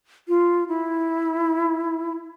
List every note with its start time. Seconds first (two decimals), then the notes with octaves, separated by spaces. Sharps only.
0.28 F4
0.68 E4